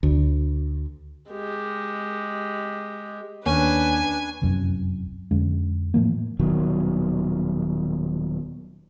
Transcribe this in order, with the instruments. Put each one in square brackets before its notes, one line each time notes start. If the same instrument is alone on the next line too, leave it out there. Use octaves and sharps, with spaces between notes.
[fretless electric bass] D2
[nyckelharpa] G#3 G4
[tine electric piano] D#2 [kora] C#4 [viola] D4 B4 [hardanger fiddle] G#5
[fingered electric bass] F1 C2 F#2 C#4
F2 D3 G#3 C#4
A2 E3 F3 A#3
D#1 B2 D#3 F#3